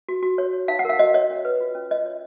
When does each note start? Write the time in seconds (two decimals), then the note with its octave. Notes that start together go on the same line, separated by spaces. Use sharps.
0.09 F#4
0.23 F#4
0.38 C#5
0.53 C#5
0.68 D#4 F5
0.79 F#5
0.85 A#4 F5
0.99 F#4 D#5
1.14 C#5 D#5
1.30 C#4
1.45 B4
1.60 F4
1.75 C#4
1.91 F4 D#5
2.06 C#5